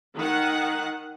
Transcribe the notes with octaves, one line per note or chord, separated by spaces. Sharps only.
D#3 F#5